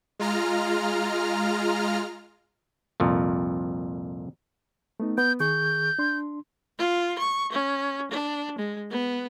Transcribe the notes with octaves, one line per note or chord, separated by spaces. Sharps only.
G#3 F4 A#5 F6
C2 F2 A#2
A3 B3 D#4
B3 G6
D#3 G#4 C#6 G6
D4 C6
F4
C#6
C#4
D4
G#3
B3